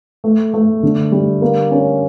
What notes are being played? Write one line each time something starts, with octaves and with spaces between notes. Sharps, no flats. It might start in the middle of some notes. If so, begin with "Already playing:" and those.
A3
A3
D3
G3
A#3
C#4